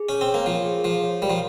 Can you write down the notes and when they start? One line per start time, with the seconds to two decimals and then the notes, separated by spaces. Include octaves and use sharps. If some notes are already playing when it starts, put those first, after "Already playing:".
Already playing: G#4
0.09 C#4 C#5
0.21 C4
0.28 C#5
0.34 A#3
0.46 F3 F4
0.65 G#4
0.84 F3 F5
1.04 C#5
1.22 G3 A#4
1.30 F3